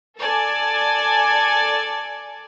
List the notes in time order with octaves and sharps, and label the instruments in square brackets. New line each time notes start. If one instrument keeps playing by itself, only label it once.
[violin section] A4 D5 G#5